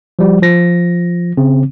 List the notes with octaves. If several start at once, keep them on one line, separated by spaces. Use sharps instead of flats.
F3 G3 F#4
F3 A#6
C#3 C4